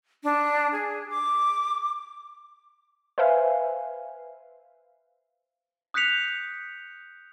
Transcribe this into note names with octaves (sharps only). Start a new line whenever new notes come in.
D4
G#4
D6
B4 C5 E5 F5 G#5
D#6 F#6 G6 B6 C#7 F7